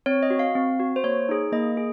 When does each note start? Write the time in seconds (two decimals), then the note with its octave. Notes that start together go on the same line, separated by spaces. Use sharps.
0.06 C4 C#5
0.23 D#5
0.30 F#4
0.39 F5
0.55 C4
0.79 F#4
0.96 C5
1.04 A#3 C#5
1.29 D#4 G#4
1.52 A#3 D#5
1.77 G#4